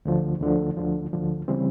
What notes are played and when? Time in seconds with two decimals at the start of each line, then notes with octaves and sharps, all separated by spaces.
0.05 D2 D3 F3
0.41 D2 D3 F3
0.77 D2 D3 F3
1.13 D2 D3 F3
1.48 C#3 E3 G3 C4